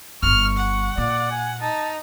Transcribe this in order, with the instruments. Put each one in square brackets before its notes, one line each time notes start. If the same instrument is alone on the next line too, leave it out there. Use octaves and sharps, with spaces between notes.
[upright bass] D1 G1 [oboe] C#6 [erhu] F6
[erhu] F#5
[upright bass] A#2 [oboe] D5
[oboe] G#5
[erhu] D#4 [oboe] A5